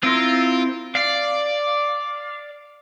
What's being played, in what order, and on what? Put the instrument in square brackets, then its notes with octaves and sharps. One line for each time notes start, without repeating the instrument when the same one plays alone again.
[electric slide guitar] C4 E4 A#4 [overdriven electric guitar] F4
[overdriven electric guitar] D5 [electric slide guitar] F5